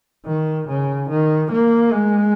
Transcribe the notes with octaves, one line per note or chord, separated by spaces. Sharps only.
D#3
C#3
D#3
A#3
G#3